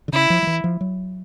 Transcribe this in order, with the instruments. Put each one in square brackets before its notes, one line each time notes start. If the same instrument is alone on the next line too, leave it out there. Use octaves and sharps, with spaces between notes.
[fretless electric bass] D3
[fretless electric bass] C#3 [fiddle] E4
[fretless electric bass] F3
F3
E3
F3
F#3